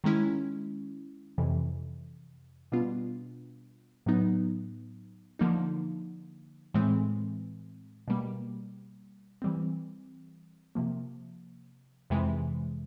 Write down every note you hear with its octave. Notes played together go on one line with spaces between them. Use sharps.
D#3 G#3 C#4 E4
F2 C3 E3
B2 G3 B3 D4 F4
A2 F#3 B3 D#4
D3 F3 A#3 D#4
A2 E3 G#3 C4
B2 G3 A#3
E3 G3 C4
C3 F3 A#3
F2 C3 E3 G#3